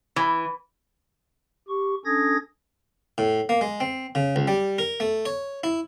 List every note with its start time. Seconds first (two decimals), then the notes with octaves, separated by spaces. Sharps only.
0.16 E3
1.68 G4 C#6
2.05 C#4 D4 A4 D#6 G#6 A#6
3.18 A2
3.49 A#3
3.61 G#3
3.80 C4
4.15 C#3
4.36 C#2
4.48 G3
4.78 A#4
5.00 A3
5.26 C#5
5.64 E4